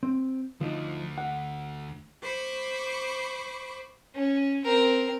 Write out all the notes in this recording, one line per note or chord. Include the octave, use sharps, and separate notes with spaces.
C4
D2 D3 F3 D#4
F#5
C5 B5 C#6 D6
C#4
C4 A#4